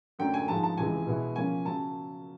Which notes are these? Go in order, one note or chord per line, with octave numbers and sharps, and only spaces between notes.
F#2 D3 F#3 A3 G5
G#5
G#2 F3 G#3 A5
A5
C#2 C3 E3 G#3 G#5
B2 G#3 B3 E4
C#3 F3 A#3 C#4 G#5
C#3 F#3 A5